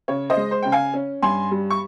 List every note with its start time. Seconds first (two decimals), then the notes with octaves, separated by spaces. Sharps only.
0.08 C#3 C#5
0.30 C5 D#5
0.37 G#3
0.51 C5
0.63 C#3 G5
0.72 F5 G#5
0.94 C#4
1.22 G2 G#5 C6
1.51 G3
1.70 C#6